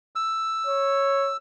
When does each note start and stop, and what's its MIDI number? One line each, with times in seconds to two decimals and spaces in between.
0.16 1.37 88
0.67 1.33 73